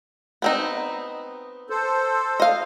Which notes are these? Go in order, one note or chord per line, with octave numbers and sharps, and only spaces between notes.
B3 C4 D#4
A4 C5
D#5 F5